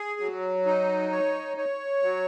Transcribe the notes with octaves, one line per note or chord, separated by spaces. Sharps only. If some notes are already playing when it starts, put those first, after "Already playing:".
Already playing: G#4
F#3
D#4
C#5
C#5
F#3